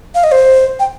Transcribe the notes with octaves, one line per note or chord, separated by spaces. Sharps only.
F5
D#5
C5
G5